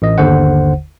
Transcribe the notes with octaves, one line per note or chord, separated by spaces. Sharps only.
A1 D#5
G1 D#2 D3 C5 F#5